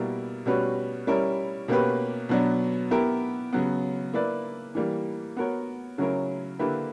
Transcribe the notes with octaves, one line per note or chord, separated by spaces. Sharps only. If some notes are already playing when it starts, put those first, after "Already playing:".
Already playing: B2 G3 A#3 E4 A#4
B2 G3 C#4 F#4 B4
G3 C#4 E4 A#4
B2 A#3 C#4 G4 B4
B2 F#3 B3 D4
B3 E4 G4 A#4
C#3 F#3 B3
A#3 E4 B4 D5
E3 G3 A#3
B3 F#4 A#4 C#5
C#3 F#3 C#4 E4 A#4
D3 A#3 E4 G4 B4